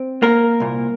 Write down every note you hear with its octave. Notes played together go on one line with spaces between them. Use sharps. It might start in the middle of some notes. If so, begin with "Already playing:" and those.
Already playing: C4
A#3 A#4
C2 A#2